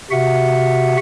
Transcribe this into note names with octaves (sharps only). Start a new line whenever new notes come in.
C3 F#4 E5 F#5